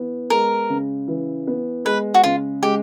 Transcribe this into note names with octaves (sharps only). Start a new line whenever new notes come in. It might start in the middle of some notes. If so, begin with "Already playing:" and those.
Already playing: E3 B3
G#3 A#4
C#3
E3
B3
G#3 B4
F#4
C#3 F4
G#3 G4